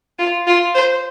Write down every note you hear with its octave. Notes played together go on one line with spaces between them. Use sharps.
F4
F4
C5